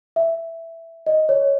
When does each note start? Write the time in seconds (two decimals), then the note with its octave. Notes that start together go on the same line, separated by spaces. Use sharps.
0.16 E5
1.06 D#5
1.29 C#5